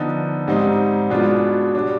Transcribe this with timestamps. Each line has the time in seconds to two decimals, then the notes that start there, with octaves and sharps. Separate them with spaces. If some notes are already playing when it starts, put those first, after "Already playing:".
Already playing: D3 F3 B3 D#4
0.48 G#2 G3 C4 D#4
1.10 B2 G#3 B3 D4 F4
1.75 G3 D4